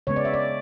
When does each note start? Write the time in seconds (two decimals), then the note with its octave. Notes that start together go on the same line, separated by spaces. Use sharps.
0.07 C#3 G#3 B3 C#5
0.16 D5
0.25 E5
0.34 D5